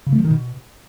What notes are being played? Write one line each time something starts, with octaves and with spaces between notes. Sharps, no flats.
C#3
A3
F3
D#3
B2